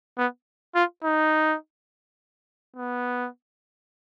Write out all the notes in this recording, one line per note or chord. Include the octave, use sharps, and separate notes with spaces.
B3
F4
D#4
B3